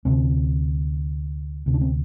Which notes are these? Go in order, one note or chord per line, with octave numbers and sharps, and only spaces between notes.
D2 C3 C4
D2 C3
D4
C4